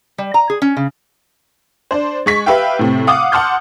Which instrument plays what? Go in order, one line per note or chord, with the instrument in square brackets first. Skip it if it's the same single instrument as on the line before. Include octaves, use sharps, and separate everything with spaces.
[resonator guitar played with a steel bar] G3
A#5
G#4
C#4
C#3
[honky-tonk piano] D4 C5
G#3 C#6 B6
G4 B4 E5 F5 G5
A2 C3 C4
F5 F#5 D6 D#6
F#5 A5 C6 F6 G6